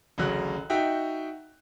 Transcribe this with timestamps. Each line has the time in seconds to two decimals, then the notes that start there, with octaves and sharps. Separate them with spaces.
0.18 A1 D2 C#3 F#3 F#6
0.70 D#4 F#4 E5 G5